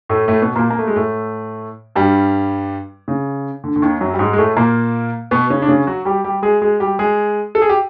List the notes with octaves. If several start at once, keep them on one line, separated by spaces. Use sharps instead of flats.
A2 A3
A2 A3
B2 B3
A#2 A#3
A#3
A3
G#3
A2 A3
G2 G3
C#3
D3
D3
D#2 D#3
F#2 F#3
G3
G#2 G#3
G#3
A2 A3
A#2 A#3
B2 B3
C#3 C#4
D4
C#3 C#4
F#3 F#4
G3 G4
G3 G4
G#3 G#4
G#3 G#4
G3 G4
G#3 G#4
A4
G#4
G4